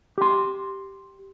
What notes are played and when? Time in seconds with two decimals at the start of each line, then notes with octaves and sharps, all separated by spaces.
0.18 G4 C6